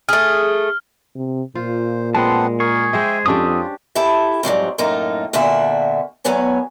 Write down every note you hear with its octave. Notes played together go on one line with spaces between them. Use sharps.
A3 G#4 F6
C3
A#2 F4 C5
G#3 B3 C4 F#5 A5 C6
G#4 A#4 C#6
G#3 C5 D#5 E5 G5
F2 C#4 D4 F4 G4 D#6 E6
E4 G4 A4 E5
F2 G#2 F#3 G3
F#2 A2 A3 A#3 D#4
E2 A#2 D3 F#4 E5
E2 A2 F#3 B3 C#5 G#5